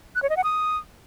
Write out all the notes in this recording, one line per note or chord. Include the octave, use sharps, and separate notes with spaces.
F#6
C#5
D#5
F#5
D#6